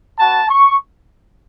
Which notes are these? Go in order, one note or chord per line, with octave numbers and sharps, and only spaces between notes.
B3 F#4 A5
C#6